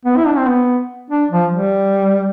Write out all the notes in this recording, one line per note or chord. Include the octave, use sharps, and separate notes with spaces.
B3
E4
D4
C4
B3
D4
F3
G3